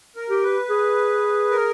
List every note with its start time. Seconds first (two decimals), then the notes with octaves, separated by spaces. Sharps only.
0.16 A#4
0.30 G4
0.43 B4
0.70 G#4
1.51 A#4